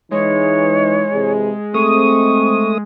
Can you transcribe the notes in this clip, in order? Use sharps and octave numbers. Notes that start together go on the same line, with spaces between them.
E3 G#3 D#4 C#5
C3 E3 G#4
A3 C4 C#6 D#6